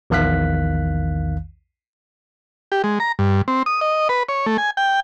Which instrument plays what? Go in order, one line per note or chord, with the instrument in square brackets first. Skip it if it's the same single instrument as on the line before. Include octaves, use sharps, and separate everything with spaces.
[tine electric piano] A#1 E2 D#3 F5 F#6 B6
[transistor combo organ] G4
G#3
A#5
G2
C4
D#6
D#5
B4
C#5
A3
G#5
G5